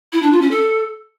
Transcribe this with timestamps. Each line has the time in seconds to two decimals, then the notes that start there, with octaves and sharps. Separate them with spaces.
0.12 E4
0.22 D4
0.32 F4
0.41 C#4
0.51 A4